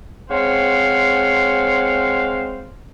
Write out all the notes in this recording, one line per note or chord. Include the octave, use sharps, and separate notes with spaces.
G#3 C4 C5 C#5 F5 F#5